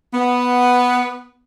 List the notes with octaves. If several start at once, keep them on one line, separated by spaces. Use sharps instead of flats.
B3